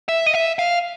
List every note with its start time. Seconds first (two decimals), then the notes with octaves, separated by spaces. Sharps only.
0.09 E5
0.26 D#5
0.34 E5
0.59 F5